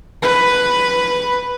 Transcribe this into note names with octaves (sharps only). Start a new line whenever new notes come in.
B4